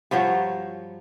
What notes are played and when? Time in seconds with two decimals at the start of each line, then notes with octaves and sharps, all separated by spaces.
0.11 G2 F3 F#3 C#5